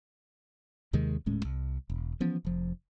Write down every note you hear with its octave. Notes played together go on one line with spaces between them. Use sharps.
D#2 C3 D#3 G#3
D#1 A2 G#3 C#4
C2
E1
E3 F3 B3 C#4
F1 F3